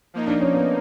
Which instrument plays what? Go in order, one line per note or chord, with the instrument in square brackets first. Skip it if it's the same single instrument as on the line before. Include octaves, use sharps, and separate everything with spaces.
[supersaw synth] F3 A#3 D#4
[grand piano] D4
C#4
B3